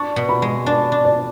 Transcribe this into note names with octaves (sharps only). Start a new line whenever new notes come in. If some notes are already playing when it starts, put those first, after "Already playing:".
Already playing: D4 C#6
B2
B5
G#3
D4 D5
D4
D5